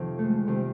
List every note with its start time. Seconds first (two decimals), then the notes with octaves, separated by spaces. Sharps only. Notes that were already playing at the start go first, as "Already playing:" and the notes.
Already playing: F2 C3 D#3
0.19 A3
0.24 G#3
0.47 C3 D#3 G3